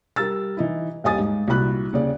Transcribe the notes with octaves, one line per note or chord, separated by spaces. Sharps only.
G3 A#4 E6 A6
E3 D#4 E4
D#1 G3 D#5 G#5 D#6 A6
G#2
C2 A#2 F#4 B5 F#6
D#2 C#3 D5